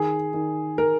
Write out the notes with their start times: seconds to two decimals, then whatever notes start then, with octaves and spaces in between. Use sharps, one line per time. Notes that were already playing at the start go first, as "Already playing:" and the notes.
Already playing: D#3 G#4
0.34 D#3
0.78 A#4